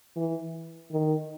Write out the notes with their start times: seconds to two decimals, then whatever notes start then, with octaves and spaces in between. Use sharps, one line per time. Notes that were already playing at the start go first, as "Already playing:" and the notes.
0.16 E3
0.92 D#3